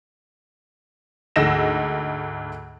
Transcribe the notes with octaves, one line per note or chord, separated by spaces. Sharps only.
D2 G#2 D#5 E6 A#6 E7